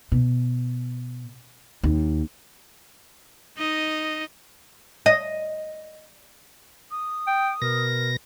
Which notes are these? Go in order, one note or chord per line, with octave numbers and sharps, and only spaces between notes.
B2
D#2
D#4 D#5
D#5
D#6
G5
B2 A#4 A#6